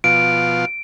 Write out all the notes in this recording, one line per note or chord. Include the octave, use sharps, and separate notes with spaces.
B2 F3 F4 D7